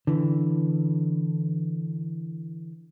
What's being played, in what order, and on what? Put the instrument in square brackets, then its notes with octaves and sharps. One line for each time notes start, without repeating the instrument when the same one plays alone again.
[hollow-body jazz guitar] D3 E3